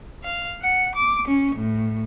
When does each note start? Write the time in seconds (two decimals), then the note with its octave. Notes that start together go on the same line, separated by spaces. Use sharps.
0.24 F5
0.60 F#5
0.94 D6
1.26 C#4
1.54 A2